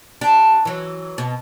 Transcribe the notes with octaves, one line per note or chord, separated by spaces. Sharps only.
D4 G4
E3 F#3
B2